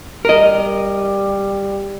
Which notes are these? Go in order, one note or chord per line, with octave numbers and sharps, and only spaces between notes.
G3 A#4 D#5